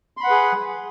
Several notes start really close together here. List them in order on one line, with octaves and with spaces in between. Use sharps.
C6 B5 F#5 B4 G#4